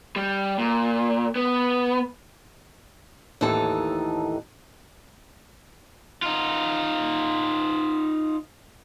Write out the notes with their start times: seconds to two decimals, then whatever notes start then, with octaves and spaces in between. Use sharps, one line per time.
0.16 G3
0.58 A#2
1.36 B3
3.41 D#2 A2 E3 D#4 A4 A5
6.22 D#4 F4